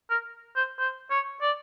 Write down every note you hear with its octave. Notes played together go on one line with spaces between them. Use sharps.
A#4
C5
C5
C#5
D5